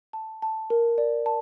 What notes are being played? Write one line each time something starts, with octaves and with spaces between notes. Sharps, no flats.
A5
A5
A#4
D5
A5